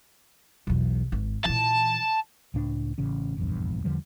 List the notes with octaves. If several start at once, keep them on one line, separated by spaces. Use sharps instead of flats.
B1 E2
G#1
A#2 E3 A5
C#2 A2 D4
A1 C#3 C#4
F1 A#1 E2 G2
E2 D3 F3 G3